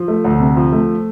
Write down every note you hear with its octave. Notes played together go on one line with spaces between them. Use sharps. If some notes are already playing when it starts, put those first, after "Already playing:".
Already playing: F3
A3
D2
C3
F3
A3